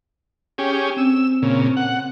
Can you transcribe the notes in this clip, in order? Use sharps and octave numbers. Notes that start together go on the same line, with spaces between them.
C#4 G4 G#4
C4 E6
A#2 C#3
F#5